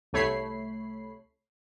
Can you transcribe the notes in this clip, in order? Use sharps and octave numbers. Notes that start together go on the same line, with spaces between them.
C2 A3 C#5 B5 C7